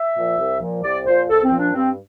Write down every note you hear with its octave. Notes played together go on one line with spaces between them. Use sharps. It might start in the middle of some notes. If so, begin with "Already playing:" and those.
Already playing: E5
A#2 F3
C2
A#2 F3
C2 D5
A#2 F3 C5
C2 A4
C4
A#2 F3
D4
G2 C4